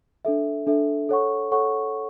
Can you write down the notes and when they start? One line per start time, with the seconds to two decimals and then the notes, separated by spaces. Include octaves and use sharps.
0.25 D4 A4 E5
0.67 D4 A4 E5
1.09 A4 C#5 F#5 C#6
1.52 A4 C#5 F#5 C#6